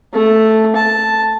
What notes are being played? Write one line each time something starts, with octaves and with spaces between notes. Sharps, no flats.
A3
A5